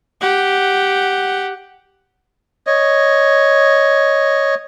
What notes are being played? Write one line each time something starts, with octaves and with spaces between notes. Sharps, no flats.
G4 F#5
C#5 D#5